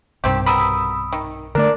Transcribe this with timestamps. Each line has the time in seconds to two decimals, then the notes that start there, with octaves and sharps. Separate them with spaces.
0.24 B1 G2 C3 D#3 C4 G4
0.46 B2 G3 A#4 B5 D#6 E6
1.13 D#3
1.55 D3 A3 D4 A#4 D5